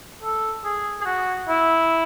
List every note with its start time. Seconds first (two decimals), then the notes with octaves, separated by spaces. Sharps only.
0.23 A4
0.65 G#4
1.01 G#4
1.06 F#4
1.48 E4